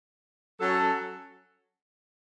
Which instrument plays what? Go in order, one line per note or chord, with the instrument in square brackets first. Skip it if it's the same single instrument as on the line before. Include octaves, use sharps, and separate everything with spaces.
[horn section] F#3 C#4 F#4 A4